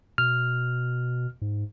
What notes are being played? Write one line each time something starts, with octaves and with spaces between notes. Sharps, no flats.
B2 F6
G#2